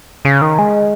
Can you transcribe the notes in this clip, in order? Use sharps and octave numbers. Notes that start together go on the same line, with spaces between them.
C#3
D#3
G#3